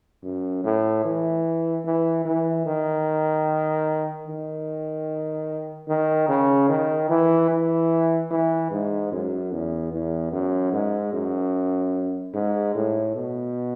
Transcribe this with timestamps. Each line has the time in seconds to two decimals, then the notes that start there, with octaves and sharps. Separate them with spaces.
0.24 F#2
0.64 A2
1.05 E3
1.85 E3
2.25 E3
2.66 D#3
4.27 D#3
5.89 D#3
6.29 C#3
6.69 D#3
7.10 E3
7.50 E3
8.31 E3
8.71 G#2
9.12 F#2
9.52 E2
9.92 E2
10.32 F#2
10.73 G#2
11.13 F#2
12.34 G#2
12.75 A2
13.15 B2